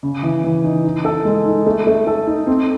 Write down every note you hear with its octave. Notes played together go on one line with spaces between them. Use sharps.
C#3
E3
E3
D#4
D#4
A4
G#3
D#4
A3
A3
A4
D#4
C4